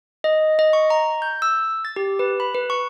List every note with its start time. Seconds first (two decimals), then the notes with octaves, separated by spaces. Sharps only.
0.24 D#5
0.59 D#5
0.73 C#6
0.90 A#5
1.22 G6
1.42 E6
1.85 A6
1.96 G4
2.19 B4
2.40 B5
2.55 B4
2.70 C#6